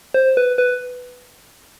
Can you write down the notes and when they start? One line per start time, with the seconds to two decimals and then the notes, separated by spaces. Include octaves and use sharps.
0.14 C5
0.37 B4
0.58 B4